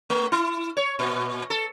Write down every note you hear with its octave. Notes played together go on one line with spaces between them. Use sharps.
A3
E4
C#5
A#2
A4